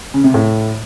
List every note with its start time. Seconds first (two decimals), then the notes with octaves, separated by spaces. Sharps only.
0.14 C#3
0.24 C3
0.34 A2